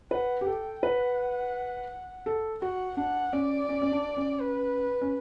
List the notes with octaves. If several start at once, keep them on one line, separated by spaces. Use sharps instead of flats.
B4 F#5
G4
A4 G5
B4 F#5
A4
F#4 F#5
D4 F#5
C#4 D5
C#4
C#4
D4
C#4
B4
C#4